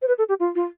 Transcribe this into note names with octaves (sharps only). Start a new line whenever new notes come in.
C5
B4
A4
G4
F4
F4